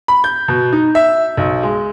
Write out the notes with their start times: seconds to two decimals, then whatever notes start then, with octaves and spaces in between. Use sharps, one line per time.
0.08 B5
0.24 G6
0.48 B2
0.72 D#4
0.95 E5
1.37 B1
1.63 G#3